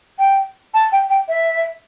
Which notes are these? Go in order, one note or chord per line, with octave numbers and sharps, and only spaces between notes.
G5
A5
G5
G5
E5